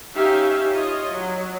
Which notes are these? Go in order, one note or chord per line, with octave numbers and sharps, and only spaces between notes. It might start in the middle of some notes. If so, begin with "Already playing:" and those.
C#4 D#4 G4 E5 F5
F4 C#5 D#5
F#3